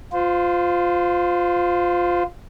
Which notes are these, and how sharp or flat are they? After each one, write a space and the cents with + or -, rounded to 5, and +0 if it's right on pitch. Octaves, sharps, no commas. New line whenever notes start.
F4 +10 C5 -25